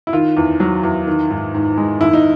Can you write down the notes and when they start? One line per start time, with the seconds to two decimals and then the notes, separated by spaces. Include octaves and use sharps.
0.07 E4
0.13 D#3 F4
0.37 E2
0.60 F#3
0.83 E2
1.07 D#3
1.30 G#2
1.54 G#2
1.77 G#3
2.01 D#2 E4
2.13 D#4